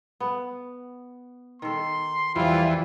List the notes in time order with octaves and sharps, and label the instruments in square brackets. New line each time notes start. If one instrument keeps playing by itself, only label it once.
[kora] B3
[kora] D#3 A4 [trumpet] C6
[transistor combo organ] E2 E3 [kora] F3 G3 [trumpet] F4